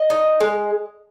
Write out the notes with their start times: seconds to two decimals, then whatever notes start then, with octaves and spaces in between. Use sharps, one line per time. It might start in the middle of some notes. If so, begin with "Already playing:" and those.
Already playing: D#5
0.10 D#4
0.40 G#3